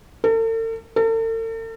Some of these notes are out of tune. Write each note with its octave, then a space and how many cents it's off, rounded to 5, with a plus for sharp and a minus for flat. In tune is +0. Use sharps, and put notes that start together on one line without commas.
A4 +45
A4 +45